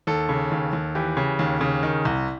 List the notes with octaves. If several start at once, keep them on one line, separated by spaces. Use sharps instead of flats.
D#2 A4
C#3
D#2
D#2
E3 G4
C#3
D#2
C#3
D#3
C2